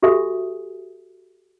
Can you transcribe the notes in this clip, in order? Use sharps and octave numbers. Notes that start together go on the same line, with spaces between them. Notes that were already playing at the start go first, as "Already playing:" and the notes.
F#4 G4 A4 E5 G#5 D#6